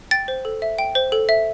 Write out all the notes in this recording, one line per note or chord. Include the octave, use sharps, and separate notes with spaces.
G5 A6
C5
A4
E5
G5
C5
A4
E5